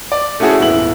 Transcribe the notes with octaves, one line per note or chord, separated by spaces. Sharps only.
D5
A3 C#4 E4 F#4 G#4 A4
D#1 G#1 B3 E4 F#7